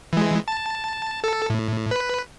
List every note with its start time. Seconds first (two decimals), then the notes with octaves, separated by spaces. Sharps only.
0.13 E3 G#3
0.48 A5
1.24 A4
1.50 A2
1.91 B4